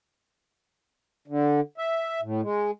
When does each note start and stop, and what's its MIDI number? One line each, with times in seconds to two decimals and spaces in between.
1.28 1.60 50
1.78 2.21 76
2.22 2.41 45
2.42 2.71 56